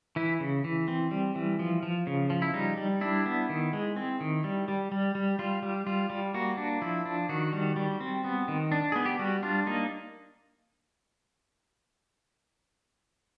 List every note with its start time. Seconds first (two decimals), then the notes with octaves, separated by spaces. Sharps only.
0.16 E3 E4
0.40 C#3
0.64 E3
0.88 C4
1.11 G3
1.35 E3
1.59 F3
1.83 F3
2.07 C#3
2.30 F3
2.42 E4
2.54 G3 D#4
2.77 G3
3.01 D4 E4
3.26 B3
3.49 D#3
3.73 G#3
3.96 C4
4.21 D#3
4.44 G3
4.68 G3
4.92 G3
5.15 G3
5.39 G3 F4
5.63 G3
5.87 G3 F4
6.10 G3
6.34 A#3 F#4
6.57 D4
6.82 F3 E4
7.05 D4
7.29 D#3 F#4
7.53 G3
7.76 G3
8.00 C4
8.24 B3
8.48 D#3
8.72 D4
8.92 B3 G#4
9.06 G4
9.19 G3 F#4
9.43 D4 F4
9.67 A#3 D#4